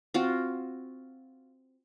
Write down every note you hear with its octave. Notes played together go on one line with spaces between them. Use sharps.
C4 F4 F#4